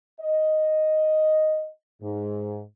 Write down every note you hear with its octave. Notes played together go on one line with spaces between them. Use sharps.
D#5
G#2